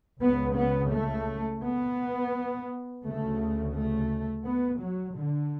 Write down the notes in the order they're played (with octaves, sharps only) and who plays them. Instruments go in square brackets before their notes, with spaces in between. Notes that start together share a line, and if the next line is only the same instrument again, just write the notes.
[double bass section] C#2 C#3 B3
B3
A3
B3
D2 C#3 A3
A3
B3
F#3
D3